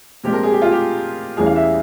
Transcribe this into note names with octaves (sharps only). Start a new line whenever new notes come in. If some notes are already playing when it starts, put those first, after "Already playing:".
A#2 F3 G#3 C4 G4
A#4
G#4
G4
F4
G4
E2 E3 G3 C#4 G#4
F5
E5